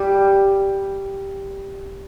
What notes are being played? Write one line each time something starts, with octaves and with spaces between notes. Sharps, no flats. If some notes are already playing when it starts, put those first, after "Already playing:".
Already playing: G3